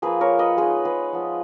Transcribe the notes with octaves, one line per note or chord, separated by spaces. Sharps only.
F3 A#3 F4 G#4 B4
A#4 C#5
B4 D#5
G#3 B3 D#4 G#4 B4
G#4 B4
F3 B3 F4